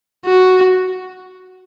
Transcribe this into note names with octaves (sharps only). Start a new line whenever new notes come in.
F#4